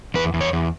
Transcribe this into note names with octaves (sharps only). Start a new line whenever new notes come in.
E2 B4
E2
C#5
E2